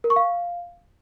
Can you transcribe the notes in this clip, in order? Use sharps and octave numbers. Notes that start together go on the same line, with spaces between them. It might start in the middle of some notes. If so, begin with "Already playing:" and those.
A#4
C#6
F5